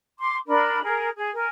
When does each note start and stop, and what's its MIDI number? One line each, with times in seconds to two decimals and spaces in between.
0.19 0.36 84
0.19 0.36 86
0.47 0.81 62
0.47 0.81 70
0.47 0.81 83
0.82 1.07 68
0.82 1.07 70
1.15 1.29 68
1.33 1.48 70
1.33 1.48 80